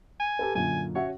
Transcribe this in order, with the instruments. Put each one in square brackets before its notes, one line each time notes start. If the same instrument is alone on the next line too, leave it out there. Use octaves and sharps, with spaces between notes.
[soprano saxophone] G#5
[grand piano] G4 A4 B4
[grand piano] F#2 A#2 D3 [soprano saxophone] G#5
[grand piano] C#4 F#4 E5 [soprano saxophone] C#5